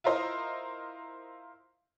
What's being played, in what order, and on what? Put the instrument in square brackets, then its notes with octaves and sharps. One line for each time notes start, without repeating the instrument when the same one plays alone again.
[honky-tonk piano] E4 F4 A#4 C5 D#5